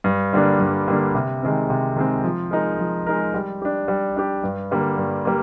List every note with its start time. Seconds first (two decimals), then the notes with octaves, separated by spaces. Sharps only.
0.04 G2
0.33 D3 G3 A#3 D4
0.60 G2
0.88 D3 G3 A#3 D4
1.15 C3
1.42 D#3 G#3 C4
1.70 C3
1.96 D#3 G#3 C4
2.24 F3
2.51 G#3 D#4 A#4
2.79 F3
3.07 G#3 D#4 A#4
3.34 G3
3.62 D4 G4
3.88 G3
4.16 D4 G4
4.44 G2
4.71 D3 G3 A#3
4.98 G2
5.25 G3 A#3